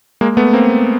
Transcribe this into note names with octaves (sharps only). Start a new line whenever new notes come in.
G#3 A#3
A3 B3
A#3 C4